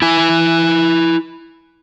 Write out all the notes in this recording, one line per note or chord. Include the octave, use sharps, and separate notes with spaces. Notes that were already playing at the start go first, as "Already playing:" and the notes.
E4 G#5